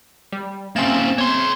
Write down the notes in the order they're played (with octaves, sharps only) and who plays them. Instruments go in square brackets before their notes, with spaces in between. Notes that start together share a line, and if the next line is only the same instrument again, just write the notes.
[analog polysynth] G3
[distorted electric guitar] A#3 C#4 [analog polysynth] C4 E7 [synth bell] E5 A6
[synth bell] B3 [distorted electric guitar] C#5 C6